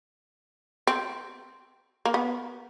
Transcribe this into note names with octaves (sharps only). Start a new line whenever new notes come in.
C4
A#3
B3